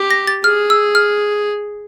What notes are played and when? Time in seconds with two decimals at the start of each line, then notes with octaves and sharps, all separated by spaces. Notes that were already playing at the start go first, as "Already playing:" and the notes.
Already playing: G4
0.11 A#6
0.27 A6
0.44 G#4 F6
0.70 E6
0.95 F6